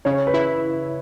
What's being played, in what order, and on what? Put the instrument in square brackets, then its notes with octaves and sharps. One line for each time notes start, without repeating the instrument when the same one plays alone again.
[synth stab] C#3 [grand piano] C#5
[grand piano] B4
[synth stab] E4